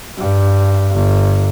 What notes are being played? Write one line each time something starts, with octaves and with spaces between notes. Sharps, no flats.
G2
G1